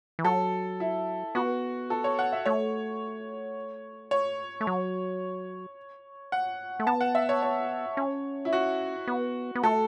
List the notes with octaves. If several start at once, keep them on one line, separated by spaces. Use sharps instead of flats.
E3
F#3 A4
E4
B3 F#4
A4
C#5
F#5
E5
A3 C#5
C#5
A3
F#3
F#5
A3
B3 A5
F#5
E5
C#5
C#5
C#4
E4
F#4
B3
B3
A3 A4